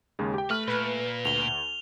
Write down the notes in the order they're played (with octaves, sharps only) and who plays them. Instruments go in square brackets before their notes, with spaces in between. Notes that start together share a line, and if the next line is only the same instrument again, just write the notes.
[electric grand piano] D#2 C#3 G#3
G4 G5
[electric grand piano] A3 F6 [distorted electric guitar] B4
[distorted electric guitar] A#2 [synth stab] B4
[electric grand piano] D2 [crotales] F7 G7